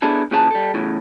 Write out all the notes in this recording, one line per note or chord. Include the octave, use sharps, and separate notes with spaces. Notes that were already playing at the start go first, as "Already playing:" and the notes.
B3 D4 E4 G#4 A4
A#2 C#3 E3 G#4 D5 A5
G3 A4
E2 A2 C#3